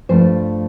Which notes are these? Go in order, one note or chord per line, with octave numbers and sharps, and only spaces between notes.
G2 F3 A3 D4 C5